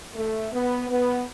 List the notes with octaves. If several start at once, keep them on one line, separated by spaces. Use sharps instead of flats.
A3
B3
B3